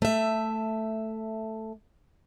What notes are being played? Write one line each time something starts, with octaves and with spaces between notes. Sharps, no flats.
A3 E5